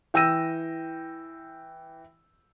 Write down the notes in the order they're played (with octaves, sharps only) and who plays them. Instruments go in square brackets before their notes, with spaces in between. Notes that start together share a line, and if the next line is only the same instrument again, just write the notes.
[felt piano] E3 G5 E6 A#6 D#7